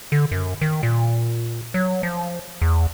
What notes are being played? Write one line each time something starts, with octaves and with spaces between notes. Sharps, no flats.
D3
F#2
D#3
A#2
F#3
F3
E2